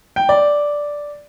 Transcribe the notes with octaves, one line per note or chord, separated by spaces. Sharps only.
G5
D5